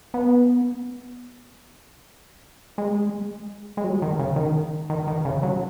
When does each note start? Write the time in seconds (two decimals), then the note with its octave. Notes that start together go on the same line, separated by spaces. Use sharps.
0.14 B3
2.78 G#3
3.77 G#3
3.84 F#3
4.02 D#3
4.19 C#3
4.36 D#3
4.90 D#3
5.07 D#3
5.25 C#3
5.43 F#3